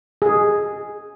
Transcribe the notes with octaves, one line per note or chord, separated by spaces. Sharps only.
G#4